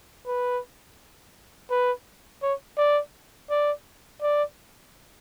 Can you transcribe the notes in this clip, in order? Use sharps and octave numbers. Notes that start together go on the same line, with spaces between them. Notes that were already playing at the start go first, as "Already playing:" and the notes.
B4
B4
C#5
D5
D5
D5